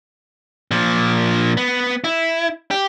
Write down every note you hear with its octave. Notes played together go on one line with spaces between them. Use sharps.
A#2 F3
B3
E4
G4